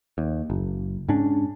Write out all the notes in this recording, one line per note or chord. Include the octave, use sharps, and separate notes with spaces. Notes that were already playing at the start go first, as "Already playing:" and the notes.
D#2
F#1
G#2 C#4 D4